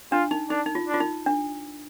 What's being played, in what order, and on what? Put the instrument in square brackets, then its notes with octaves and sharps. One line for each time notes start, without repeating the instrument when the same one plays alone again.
[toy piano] D4 [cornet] F4
[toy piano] D#4
[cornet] D4 [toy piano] D#4
[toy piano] D#4
F4
[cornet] D4
[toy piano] F4
D#4
D4